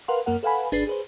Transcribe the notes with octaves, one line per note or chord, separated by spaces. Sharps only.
A#4 B4 F5 F#5 C6
F#2 A#3 A#4 F#5
A4 B4 F5 F#5 G#5 B5
G#1 D4 G#4 B4 A6 C7
G#4 B4 C5